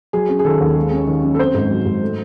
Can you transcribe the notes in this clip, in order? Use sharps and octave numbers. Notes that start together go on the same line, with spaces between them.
F#3 G#4
C#4
G#4
D#3 A4
D#2
G#3
C#4
D#3
F#2
A4
C4 C5
G#2
F#3
G#2
A3